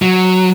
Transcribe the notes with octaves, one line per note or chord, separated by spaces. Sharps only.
F#3